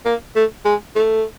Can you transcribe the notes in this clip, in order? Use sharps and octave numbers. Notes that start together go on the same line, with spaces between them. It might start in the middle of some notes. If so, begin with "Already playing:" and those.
A#3
A3
G#3
A3